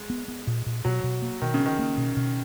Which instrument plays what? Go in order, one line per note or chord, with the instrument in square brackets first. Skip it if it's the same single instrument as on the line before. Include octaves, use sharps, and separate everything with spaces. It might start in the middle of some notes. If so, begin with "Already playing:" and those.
Already playing: [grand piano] G#3
[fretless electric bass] B3
B3
A#2
A#2
[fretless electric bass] B2 [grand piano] F#3
[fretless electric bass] B2
A#3
[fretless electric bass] B2 [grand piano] D#3
[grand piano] C#3
[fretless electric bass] C#4
[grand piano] D#3
[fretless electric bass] A#3
B2
B2